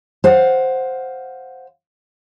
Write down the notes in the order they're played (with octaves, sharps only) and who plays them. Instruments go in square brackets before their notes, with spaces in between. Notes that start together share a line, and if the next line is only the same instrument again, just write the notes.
[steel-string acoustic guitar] C5 F5 F#5